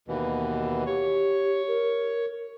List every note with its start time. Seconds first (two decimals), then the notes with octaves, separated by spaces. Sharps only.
0.08 D#2 B2 E3
0.86 G4 C#5
1.68 A#4